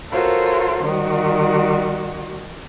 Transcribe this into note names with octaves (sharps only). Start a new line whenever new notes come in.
F4 F#4 A4 A#4 C5 C#5
D#3 G3 F#4